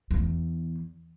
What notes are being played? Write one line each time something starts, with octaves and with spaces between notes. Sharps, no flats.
E2